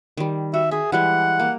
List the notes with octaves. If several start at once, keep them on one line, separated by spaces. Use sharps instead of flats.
D#3 G3
F#4 E5
G#4 E5
E3 G3 G#3 F#5
A#3